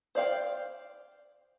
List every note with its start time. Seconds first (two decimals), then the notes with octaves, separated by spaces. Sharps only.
0.15 C5 D5 F5 G5